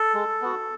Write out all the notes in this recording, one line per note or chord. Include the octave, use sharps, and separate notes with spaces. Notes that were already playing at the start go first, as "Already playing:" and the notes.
Already playing: A4
G#3
B3 F#4